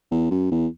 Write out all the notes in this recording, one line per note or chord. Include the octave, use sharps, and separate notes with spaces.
E2
F#2
E2